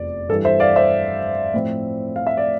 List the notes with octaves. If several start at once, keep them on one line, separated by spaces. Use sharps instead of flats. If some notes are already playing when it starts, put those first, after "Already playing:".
Already playing: F1 E2 F3 D5
G2 E3 G3 A4
C5 E5
D5 F5
C5 E5
A2 F3 C4 E4
F5
E5
D5